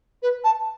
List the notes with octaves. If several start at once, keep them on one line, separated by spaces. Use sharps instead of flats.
B4
A5